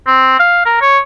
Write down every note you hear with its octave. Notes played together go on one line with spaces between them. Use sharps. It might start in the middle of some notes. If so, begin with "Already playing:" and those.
C4
F5
A#4
C#5